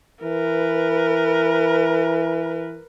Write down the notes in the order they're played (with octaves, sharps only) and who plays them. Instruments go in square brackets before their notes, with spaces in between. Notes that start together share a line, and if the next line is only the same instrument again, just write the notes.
[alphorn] E3 [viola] A#4 B4